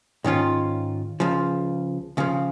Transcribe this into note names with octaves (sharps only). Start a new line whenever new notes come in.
G#2 D#3 C#4 F4
C#2 C#3 F3
C#2 C#3 F3